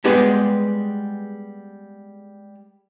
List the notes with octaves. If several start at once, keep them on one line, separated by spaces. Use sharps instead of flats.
G3 G#3 B3 G4 G#4 B4